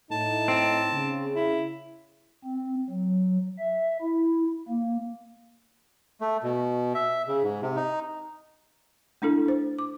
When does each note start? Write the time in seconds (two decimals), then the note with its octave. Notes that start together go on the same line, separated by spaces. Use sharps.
0.11 A2 D#4 A5
0.48 C4
0.92 C#3
1.35 E4
2.44 C4
2.90 F#3
3.59 E5
4.01 E4
4.69 A#3
6.21 A3
6.43 B2
6.95 E5
7.28 C#3
7.43 G#2
7.62 C3
7.76 D#4
9.22 A3 D4 E4 A4
9.46 D4 C5
9.79 D6